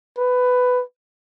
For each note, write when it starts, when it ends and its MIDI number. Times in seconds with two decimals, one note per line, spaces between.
0.18 0.83 71